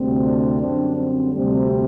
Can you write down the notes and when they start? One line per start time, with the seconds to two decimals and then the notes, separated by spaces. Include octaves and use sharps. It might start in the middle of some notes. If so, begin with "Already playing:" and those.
Already playing: D2 C3 G3 C4
0.24 D4
0.61 F#2 D3 G3 C4 D4
0.96 C4
1.33 D2 C3 G3 C4